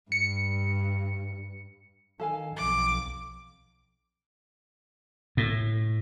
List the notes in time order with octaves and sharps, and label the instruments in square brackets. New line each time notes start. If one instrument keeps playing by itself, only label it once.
[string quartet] G2 [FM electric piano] C#7
[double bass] D#3 [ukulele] A4 F5 G#5
[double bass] B1 F2 [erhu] D6
[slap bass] A2